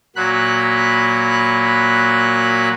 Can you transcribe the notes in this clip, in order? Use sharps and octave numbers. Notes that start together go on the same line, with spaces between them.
A#2 F#3 B5 F#6